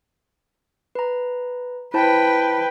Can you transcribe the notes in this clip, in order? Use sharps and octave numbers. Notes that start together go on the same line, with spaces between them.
B4 A#5
E4 B4 C5 G5 A5